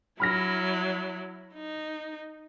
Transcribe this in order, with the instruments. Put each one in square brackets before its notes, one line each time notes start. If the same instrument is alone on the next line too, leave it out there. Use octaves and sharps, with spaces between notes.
[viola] F#3 E4 [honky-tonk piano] B5 F6 A#6
[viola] D#4